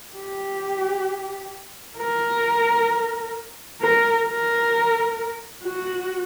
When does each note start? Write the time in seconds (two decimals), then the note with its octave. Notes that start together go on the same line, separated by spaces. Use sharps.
0.15 G4
1.98 A#4
3.82 A#4
4.27 A#4
5.64 F#4